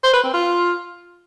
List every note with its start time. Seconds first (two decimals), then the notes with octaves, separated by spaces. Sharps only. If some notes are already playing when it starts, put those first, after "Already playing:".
0.04 C5
0.14 B4
0.24 C4
0.34 F4